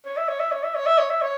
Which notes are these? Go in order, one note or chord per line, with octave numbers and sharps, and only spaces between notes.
C#5
E5
C#5
E5
C#5
E5
C#5
E5
C#5
E5
C#5